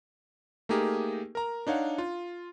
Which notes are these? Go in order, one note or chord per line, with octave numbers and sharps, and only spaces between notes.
A3 A#3 D#4 G4 G#4 A#4
A#4 A#5
D4 D#4 C#5 F5 F#5
F4